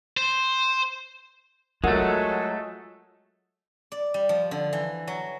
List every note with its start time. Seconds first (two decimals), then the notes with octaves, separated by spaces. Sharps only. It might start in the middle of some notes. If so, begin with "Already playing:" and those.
0.17 C5
1.84 F#3 G#3 A3 F4 A4 A#4 F#5
3.92 D5
4.14 G3
4.29 F3
4.51 D3
4.73 E3
5.08 F#3